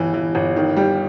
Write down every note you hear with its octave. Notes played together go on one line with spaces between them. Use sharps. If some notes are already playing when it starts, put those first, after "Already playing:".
Already playing: G1 E3
E3
G1
D#3
G3